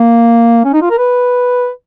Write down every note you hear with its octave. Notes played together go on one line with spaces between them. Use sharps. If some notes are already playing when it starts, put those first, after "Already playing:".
Already playing: A#3
C#4
D#4
F4
A#4
B4